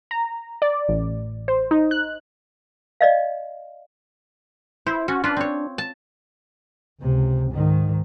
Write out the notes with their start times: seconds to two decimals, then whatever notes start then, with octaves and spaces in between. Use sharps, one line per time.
0.11 A#5
0.62 D5
0.88 A1
1.48 C5
1.71 D#4
1.91 F#6
3.01 D5 D#5 F5
4.86 E4 C5
5.08 C#4 F#4
5.24 D4 F4 B4
5.37 C4 C#5
5.78 A5
7.01 C#2 C3
7.52 G#2 D#3